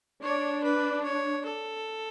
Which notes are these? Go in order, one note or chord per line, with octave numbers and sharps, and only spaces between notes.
D4 C#5
B4
C#5
A4